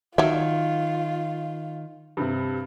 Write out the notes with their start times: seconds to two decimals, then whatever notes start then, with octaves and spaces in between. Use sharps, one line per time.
0.18 D#3 F#3 F4 E5
2.17 G2 C3